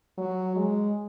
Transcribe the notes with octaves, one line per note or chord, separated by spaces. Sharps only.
F#3
G#3